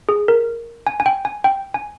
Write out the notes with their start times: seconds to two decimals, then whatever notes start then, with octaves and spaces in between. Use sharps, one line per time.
0.09 G#4
0.28 A#4
0.87 G#5
1.00 G#5
1.06 G5
1.25 G#5
1.44 G5
1.74 G#5